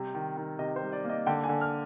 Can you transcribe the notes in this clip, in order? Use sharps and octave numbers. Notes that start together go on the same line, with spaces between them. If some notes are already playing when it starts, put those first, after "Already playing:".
Already playing: C3 G3
D#3
D#3
C3 D#5
C5
G3
D5
A#3
D#5
D3 G5
G#5
D3
F6